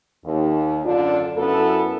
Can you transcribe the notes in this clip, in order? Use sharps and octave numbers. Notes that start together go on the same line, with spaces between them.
D#2
F#2 D3 D4 F4
F#2 B3 E4 A4